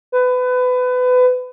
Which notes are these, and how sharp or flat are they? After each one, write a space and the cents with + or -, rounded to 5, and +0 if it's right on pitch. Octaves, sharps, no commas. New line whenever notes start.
B4 +25